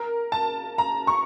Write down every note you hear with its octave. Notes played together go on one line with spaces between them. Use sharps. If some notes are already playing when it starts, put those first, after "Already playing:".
Already playing: A#4
A5
A#5
C#6